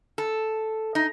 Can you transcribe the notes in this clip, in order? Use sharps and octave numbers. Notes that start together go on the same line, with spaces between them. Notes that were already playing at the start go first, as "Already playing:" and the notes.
A4
D#4